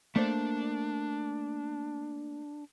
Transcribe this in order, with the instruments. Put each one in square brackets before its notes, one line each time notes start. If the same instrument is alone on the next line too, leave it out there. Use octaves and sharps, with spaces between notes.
[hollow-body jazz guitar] A3 A#3 C5 [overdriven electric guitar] D4